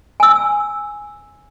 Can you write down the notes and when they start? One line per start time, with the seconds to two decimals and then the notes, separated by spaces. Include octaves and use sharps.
0.20 G#5 E6